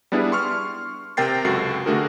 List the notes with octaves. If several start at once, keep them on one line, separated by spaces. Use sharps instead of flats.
G3 B3 D4 E4 G#4
C6 C#6 F6
C3 C4 A#4 G5 A6 C7
C#2 F#2 F#4 A4 C7
D3 A3 D4 F#4 G#4 A#4